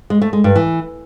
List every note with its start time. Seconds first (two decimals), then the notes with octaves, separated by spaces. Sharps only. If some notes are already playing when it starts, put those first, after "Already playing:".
0.10 G#3
0.22 A3
0.33 G#3
0.44 G2
0.56 E3